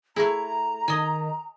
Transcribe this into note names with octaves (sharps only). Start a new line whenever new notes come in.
A3 E4 G#4 A#5
D#3 D#5 G#5